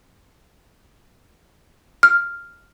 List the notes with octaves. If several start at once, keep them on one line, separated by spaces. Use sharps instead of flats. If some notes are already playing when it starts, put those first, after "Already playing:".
F6